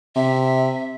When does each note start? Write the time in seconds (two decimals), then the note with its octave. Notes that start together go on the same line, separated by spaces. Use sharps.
0.16 C3 E5